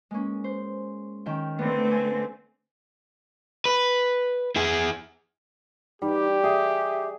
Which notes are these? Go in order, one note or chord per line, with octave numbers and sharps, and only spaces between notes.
G#3 A#3 C#4
C5
D#3 C#4 G5
D3 A3 B3 C4 D4
G#5
B4
E4 G#4
G3 D#4 G4
G#4 E5